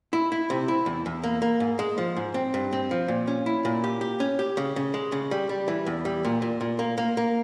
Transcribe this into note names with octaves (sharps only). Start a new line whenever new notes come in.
E4
E4
C3
E4
E2
E2
A#3
A#3
G#2
G#3
F3
G#2
C4
G2
C4
F3
A#2
C#4
E4
A#2
G4
G4
C#4
G4
C#3
C#3
G#3
C#3
G3
G3
E3
E2
G3
A#2
A#2
A#2
A#3
A#3
A#3